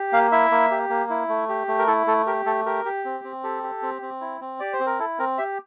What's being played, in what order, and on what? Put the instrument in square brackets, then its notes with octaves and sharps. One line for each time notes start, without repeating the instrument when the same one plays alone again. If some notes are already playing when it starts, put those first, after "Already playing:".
Already playing: [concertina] G4
A#3 F5
E4 E5
A#3
G4
A#3
E4
A3
G4
A3
A#4
E4 A4
A3 A4
G4 A#4
A3 A4
G4 A#4
G4
C4
C4
G4 A4
G4
C4
C4
E4
C4
G4 D5
C5
C4
A#4
E4 A4
C4 A#4
G4 E5